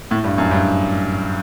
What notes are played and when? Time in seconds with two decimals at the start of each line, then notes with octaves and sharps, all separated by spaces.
0.11 A2
0.24 G2
0.38 F#2
0.51 G2